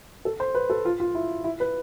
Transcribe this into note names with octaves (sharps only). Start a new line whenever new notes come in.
A4
C5
B4
A4
F4
F4
E4
E4
B4